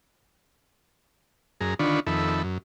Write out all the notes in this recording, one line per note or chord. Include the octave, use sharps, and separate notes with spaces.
F#2 G#4 A#5
D3 D#3 D4 F4 B5 C#6
F2 D#3 A4 E5 B5
F#2